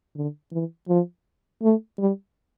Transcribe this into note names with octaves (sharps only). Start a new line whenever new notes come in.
D3
E3
F3
A3
G3